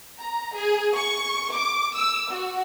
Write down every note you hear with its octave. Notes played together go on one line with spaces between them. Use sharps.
A#5
G#4
C#6
D6
E6
F#4